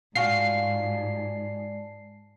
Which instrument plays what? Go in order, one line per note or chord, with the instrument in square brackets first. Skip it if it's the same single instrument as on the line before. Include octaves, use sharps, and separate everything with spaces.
[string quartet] G#2 [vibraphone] G#3 D5 A5 [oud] F4 F#4 [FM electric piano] C7